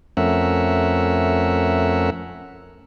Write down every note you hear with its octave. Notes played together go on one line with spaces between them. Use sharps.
F2 A3 C#4 A#4 E5 F#5